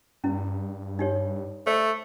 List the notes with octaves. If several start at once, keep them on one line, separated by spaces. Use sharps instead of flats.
G2 C#4 E4
D#4 G4 C#5
A3 C5 D5